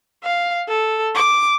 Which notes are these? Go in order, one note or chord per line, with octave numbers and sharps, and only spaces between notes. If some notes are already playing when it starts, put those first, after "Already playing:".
F5
A4
D6